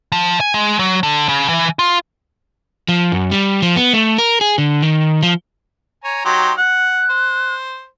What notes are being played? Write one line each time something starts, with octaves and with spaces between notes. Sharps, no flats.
F3
G#5
G#3
F#3
D3
C#3
E3
F4
F3
F#2
G3
F3
B3
A3
A#4
G#4
D3
D#3
F3
C#5 G#5 A#5
F#3 D#4 G4 C6
F#5 F#6
C5